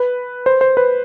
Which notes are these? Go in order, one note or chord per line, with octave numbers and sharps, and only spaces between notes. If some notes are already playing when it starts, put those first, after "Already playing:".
Already playing: B4
C5
C5
B4